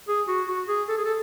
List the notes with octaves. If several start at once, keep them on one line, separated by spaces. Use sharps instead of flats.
G#4
F#4
F#4
G#4
A4
G#4
A4